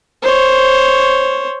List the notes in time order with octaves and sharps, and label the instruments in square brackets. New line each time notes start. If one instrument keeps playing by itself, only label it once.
[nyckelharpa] C5 C#5